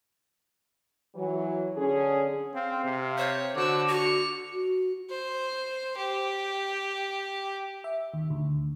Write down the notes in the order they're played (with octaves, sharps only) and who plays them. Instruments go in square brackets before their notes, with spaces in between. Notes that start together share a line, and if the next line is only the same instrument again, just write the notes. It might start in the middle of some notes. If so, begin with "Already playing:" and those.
[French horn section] E3 F#3
D3 C#4 G#4
[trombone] C4 [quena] F5
[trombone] C3
[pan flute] C5 [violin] C#5
[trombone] D3 [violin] F#4 E6 [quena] D6
[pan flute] F#4 [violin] C#7 F7
[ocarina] F#4
[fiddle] C5
G4
[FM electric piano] E5
D#2
D2